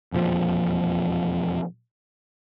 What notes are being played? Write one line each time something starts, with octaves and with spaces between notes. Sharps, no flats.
E1 F2 A#2 F3